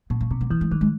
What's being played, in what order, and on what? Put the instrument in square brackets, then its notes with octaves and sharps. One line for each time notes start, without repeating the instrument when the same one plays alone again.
[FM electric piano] A#2 [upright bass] B3
[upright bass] A#3
[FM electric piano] B2 [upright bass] C4
[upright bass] B3
[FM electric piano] E3 [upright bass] A#3
[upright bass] G#3
[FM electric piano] D#3 [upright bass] G3
[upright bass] G#3